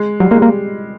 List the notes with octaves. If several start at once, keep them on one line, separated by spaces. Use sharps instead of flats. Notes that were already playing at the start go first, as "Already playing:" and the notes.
Already playing: G#3
F#3 G3
G#3 A#3
G3
A#3